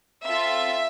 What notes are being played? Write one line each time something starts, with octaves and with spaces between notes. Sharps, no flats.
C4 F4 A4 E5